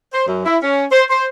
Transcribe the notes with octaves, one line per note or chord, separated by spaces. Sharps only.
C5
F#2
E4
C#4
C5
C5